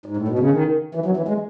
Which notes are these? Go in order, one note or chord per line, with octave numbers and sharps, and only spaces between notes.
G#2
A2
B2
C#3
D#3
E3
F#3
E3
G#3